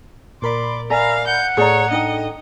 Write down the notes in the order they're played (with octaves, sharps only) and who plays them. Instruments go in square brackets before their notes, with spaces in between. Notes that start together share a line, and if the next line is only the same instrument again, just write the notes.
[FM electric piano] A#2 A#4 B5 [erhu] D5 [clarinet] C6
[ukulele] D5 E5 G#5 [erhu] F5 [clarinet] A#5
[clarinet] F#5 [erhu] G6
[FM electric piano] A2 A4 [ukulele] G#4 D5 A#5 [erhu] C#5
[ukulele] D4 D#4 G5 [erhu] D#5